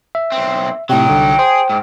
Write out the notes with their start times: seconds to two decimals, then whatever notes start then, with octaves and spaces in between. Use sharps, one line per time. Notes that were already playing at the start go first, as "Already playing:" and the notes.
0.15 E5
0.32 B1 C4
0.89 A2 C3 F#3 D#4 G5
1.09 C2 D3
1.39 G#4 C5
1.70 G#2